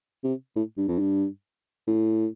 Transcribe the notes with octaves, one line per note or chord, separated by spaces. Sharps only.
C3
A2
G2
F2
G2
A2